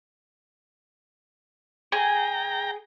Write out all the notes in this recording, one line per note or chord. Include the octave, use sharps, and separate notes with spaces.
G#4 G5 A#5